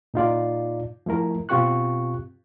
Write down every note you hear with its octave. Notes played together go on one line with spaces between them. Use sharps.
A#2 D#4 F4 D5
F3 A3 E4 A#4
B2 C4 F4 G4 C#6 F#6